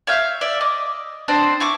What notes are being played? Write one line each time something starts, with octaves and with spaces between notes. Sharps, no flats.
C#5 E5 F5 G6
D5 E5
D#5 D6
C4 D4 C5 D#5
E4 C#6 D6